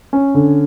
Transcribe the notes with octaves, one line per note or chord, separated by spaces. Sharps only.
C#4
D3